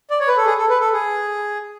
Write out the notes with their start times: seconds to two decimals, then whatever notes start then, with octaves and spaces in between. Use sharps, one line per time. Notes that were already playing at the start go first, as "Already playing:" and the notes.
0.10 D5
0.20 C#5
0.28 B4
0.37 A4
0.46 G#4
0.58 A4
0.69 B4
0.81 A4
0.93 G#4